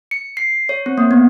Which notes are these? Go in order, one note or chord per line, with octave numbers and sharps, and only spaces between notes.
C#7
C7
C#5
C4
A#3
B3